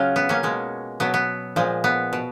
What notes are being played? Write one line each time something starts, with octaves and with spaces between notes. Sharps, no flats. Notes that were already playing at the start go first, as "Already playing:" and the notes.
Already playing: C#3 F#3 C#4 F4
B3
A#3 C#4
B2 G#3
B2 F#3 B3
B3
A#2 F3 G#3
B3
B2